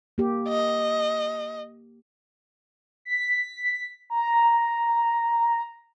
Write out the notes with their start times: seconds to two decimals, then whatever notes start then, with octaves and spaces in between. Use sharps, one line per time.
0.18 A#3 G4
0.48 D#5
3.05 B6
4.10 A#5